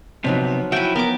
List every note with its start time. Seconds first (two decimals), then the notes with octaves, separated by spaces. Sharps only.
0.24 C3 F3 F#3 B3 D#4
0.72 E4 F#4 G5 G#5 B5
0.96 B3 A#4 D6